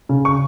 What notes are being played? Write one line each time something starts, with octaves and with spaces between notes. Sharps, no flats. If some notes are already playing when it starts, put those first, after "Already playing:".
C#3
C#6